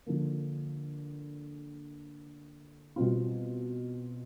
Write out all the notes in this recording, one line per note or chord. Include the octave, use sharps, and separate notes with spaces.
D3 F3 A#3
B2 G3 C4 F4